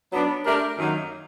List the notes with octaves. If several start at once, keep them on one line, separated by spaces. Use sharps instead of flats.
F#3 B3 D4
A3 D4 G4 A#4
F#2 D#3 F#3 A#3 D#4